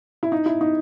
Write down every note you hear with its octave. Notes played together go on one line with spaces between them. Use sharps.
E4
D#4
E4
D#4